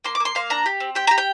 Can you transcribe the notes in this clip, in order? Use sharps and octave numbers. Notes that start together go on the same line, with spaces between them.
A#3 C6
D6
A#3
C6
A#3 F5
D4 A#5
G4
C4
G4 G5
G4 A#5
G5